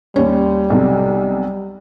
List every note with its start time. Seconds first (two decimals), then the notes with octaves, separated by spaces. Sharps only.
0.16 D#2 G3 C#4
0.70 B1 C3